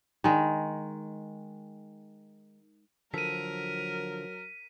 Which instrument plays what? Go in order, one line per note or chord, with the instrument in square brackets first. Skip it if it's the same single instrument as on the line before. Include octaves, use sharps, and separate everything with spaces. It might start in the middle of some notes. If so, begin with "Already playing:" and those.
[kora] D#3 G#3
[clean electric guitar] D3 F3 A4 [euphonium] F#3 [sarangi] A#4 [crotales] B6 D#7